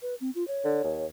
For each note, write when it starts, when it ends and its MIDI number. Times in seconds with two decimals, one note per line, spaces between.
0.02 0.15 71
0.21 0.30 60
0.35 0.46 65
0.48 1.06 73
0.65 0.84 50
0.85 1.06 39